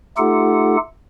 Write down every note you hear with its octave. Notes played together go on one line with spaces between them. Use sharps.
A3 D#4 F4 G4 A4 F#5